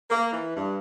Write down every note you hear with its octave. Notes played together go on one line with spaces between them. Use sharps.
A#3
E3
G2